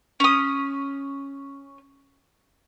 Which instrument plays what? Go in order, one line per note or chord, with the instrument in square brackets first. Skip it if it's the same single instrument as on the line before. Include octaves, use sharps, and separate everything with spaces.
[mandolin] C#4 D#6